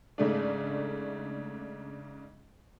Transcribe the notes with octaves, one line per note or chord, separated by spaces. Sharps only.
G#2 C#3 A3 D4